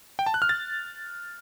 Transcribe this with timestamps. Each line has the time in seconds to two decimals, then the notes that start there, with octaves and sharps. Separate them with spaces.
0.19 G5
0.26 A5
0.34 F#6
0.42 F6
0.49 A6